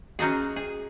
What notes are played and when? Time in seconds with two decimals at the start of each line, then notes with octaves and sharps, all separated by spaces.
0.19 C#4 D#4 F#4 G#4
0.56 G#4